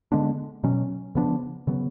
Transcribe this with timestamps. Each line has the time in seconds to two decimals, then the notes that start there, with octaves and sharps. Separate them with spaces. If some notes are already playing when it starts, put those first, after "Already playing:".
0.12 D3 G#3 B3 D4
0.64 B2 F#3 C#4
1.15 C#3 F3 B3 D4
1.67 C#3 F#3 B3